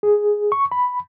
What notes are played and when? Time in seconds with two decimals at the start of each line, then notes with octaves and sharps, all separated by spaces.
0.03 G#4
0.52 C#6
0.72 B5